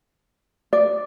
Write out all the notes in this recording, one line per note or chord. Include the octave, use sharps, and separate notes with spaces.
D5